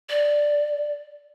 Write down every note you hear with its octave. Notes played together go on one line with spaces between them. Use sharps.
D5